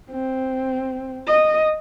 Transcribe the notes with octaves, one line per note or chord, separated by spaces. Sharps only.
C4
D#5